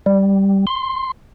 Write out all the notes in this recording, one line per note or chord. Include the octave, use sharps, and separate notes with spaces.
G3
C6